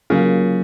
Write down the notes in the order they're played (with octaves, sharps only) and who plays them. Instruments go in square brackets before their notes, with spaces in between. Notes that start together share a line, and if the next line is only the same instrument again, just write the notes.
[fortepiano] C#3 [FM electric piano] F#3 A#3 F4